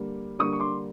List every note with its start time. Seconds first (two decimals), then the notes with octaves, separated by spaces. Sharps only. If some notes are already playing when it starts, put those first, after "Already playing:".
Already playing: D3 G3 A#3
0.39 D3 G3 A#3 C#6 D#6
0.53 C#6
0.60 C6 D6